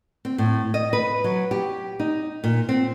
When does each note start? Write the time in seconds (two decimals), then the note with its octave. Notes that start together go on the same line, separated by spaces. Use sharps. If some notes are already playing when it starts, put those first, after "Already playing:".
0.25 C4
0.38 A2
0.74 D#5
0.93 B4
1.24 F#3
1.51 G4
2.00 D#4
2.44 A#2
2.69 C4